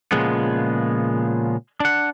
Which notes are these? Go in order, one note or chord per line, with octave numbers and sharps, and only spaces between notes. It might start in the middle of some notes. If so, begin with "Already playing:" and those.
A#2 C#3 F3 G#3 B3
D4 F#5